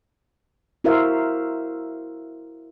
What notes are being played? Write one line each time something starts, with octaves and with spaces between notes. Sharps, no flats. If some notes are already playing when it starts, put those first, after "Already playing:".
E4 F#4 A#4 C5 E5 F5